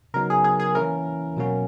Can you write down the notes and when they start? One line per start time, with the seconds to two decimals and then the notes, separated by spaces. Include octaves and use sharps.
0.14 C#3 F#3 B3 D#4 A#4
0.30 G#4
0.44 G#4
0.60 G#4
0.75 E3 A#3 C#4 E4 A#4
1.37 B2 F#3 A#3 C#4 F#4